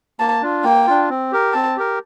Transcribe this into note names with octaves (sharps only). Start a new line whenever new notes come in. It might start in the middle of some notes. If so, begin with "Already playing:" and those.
A#3 A5
D4 F4
A#3 G5
D4 F4
C4
G4 A#4
C4 A5
G4 A#4